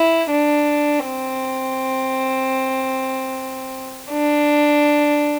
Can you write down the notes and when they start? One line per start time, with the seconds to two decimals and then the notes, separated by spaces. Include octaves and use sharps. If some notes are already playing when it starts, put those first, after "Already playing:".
Already playing: E4
0.30 D4
1.06 C4
4.11 D4